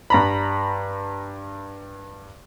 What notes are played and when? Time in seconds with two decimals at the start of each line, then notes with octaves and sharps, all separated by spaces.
0.10 G2 A#5 B5